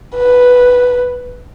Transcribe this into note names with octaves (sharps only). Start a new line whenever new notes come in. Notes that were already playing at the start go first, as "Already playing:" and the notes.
B4